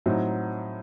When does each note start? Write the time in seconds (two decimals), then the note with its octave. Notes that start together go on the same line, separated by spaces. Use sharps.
0.06 A2 F#3 C4 D#4